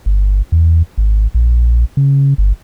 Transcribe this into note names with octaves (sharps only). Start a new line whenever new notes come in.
G1
E2
G#1
A#1
C#3
G1